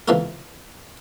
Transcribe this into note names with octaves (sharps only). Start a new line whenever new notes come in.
C#2 C3 E3 F4 A4 A#4